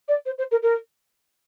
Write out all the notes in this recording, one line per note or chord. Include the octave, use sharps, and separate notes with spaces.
D5
C5
C5
A#4
A#4